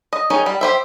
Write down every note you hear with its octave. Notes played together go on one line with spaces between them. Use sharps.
D#5
D#3 C#4 D#4 G#4 D#5
G3
G4 C5 E5